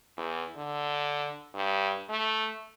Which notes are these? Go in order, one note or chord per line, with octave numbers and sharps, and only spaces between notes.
E2
D3
G2
A3